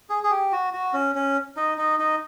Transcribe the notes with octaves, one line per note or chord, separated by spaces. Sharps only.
G#4
G#4
G4
F#4
F#4
C#4
C#4
D#4
D#4
D#4